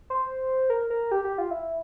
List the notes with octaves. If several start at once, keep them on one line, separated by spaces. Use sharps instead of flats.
C5
A#4
A#4
G4
G4
F4
E4